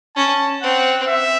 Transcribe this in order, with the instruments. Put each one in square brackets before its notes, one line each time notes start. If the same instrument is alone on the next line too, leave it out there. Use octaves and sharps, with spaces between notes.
[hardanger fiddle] C#4 [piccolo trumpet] A5
[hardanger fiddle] C4 [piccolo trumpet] F#5
[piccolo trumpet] E5